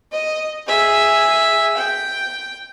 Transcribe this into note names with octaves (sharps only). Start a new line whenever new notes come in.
D#5
G#4 E5
G5